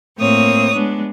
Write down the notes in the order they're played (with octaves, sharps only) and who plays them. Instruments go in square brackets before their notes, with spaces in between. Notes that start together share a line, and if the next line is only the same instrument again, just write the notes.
[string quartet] A2 A#3 C4 C#5 D#6
G#3 B3 D4